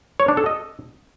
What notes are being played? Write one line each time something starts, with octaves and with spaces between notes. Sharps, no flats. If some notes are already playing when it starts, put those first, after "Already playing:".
C#5
D4
A4
D#5